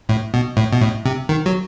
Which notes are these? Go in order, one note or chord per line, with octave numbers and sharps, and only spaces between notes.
A2
B2
A2
B2
A2
C3
D#3
F#3